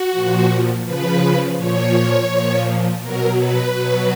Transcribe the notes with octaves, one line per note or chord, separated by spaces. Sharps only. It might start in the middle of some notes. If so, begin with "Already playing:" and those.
Already playing: F#4
A#2 F3
C#3 F3 B4
A#2 F3 C#5
A#2 F3
B2 F#3 A#4
B4
B2 F#3